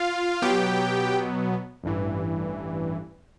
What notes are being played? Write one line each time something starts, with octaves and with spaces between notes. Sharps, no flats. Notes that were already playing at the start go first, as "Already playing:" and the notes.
Already playing: F4 F5
B2 F#3 B3 G4 G5
A1 G2 E3